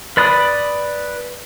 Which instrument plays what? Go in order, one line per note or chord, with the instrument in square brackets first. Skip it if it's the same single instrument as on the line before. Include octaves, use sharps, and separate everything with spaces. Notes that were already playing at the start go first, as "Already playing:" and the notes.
[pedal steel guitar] B4 D5 B5 D#6